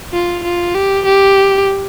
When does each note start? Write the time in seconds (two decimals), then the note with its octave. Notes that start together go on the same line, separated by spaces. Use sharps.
0.13 F4
0.43 F4
0.74 G4
1.05 G4